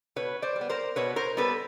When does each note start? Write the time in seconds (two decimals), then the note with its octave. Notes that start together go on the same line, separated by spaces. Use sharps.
0.16 B2 B4 C#5
0.42 C5 D5
0.56 G3
0.61 B3
0.69 A#4 C5
0.96 B2 B4 C#5
1.16 A#4 C5
1.37 G3 B3 A4 B4